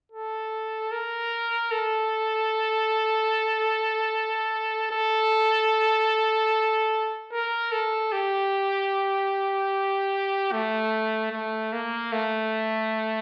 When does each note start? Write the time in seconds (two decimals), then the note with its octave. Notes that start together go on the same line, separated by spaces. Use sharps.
0.12 A4
0.92 A#4
1.72 A4
4.92 A4
7.32 A#4
7.72 A4
8.12 G4
10.52 A3
11.32 A3
11.73 A#3
12.12 A3